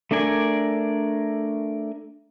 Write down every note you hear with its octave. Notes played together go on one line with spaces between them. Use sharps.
A3 D4 A#4 D5 G#5